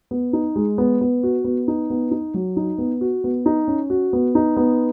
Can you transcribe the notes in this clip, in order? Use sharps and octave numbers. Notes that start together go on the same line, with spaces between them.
B3
D#4
G#3
B3
B3
F#4
B3
D#4
B3
D#4
F#3
D#4
B3
F#4
B3
D#4
C#4
F#4
B3
D#4
B3